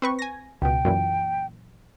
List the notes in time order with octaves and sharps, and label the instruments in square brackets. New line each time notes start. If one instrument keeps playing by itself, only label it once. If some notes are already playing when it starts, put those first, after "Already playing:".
[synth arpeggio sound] C4 B4 C#6
G#5 A#6
[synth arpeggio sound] C#2 B2 [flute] G5
[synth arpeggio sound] F#2 A#2 E3